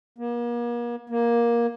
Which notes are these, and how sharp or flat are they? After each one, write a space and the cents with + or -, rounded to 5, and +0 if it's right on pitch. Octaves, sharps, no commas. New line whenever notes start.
A#3 +40
A#3 +15